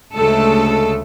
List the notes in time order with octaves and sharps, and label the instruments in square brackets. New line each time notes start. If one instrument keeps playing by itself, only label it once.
[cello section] D2 C#3 G#3 A3 A4